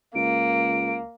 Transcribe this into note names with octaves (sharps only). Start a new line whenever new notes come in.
C#2 A#3 D7